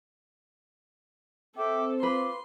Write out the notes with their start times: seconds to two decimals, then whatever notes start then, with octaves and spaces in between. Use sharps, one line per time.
1.56 C4 A4 E5 G5 D6
2.03 F4 B4 C6 D6